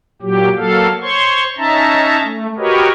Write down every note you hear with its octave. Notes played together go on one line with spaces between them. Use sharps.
A#2 F#3 G4
F#3 A#3 A4 F5
C5 C#5 C6 C#6
C#4 D#4 E5 A5 A#5
A3
F#4 G4 A#4 B4 C#5 D#5